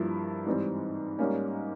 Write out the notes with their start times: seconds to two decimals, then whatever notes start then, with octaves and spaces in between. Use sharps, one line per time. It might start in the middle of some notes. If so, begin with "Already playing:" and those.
Already playing: G2 F3 A#3 E4
0.46 G#2 E3 G3 C4
1.19 G#2 G3 A#3 C#4